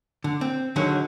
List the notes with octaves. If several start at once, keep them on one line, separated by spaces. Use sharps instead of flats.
D3
C4
D3 D#3 F#3 G#3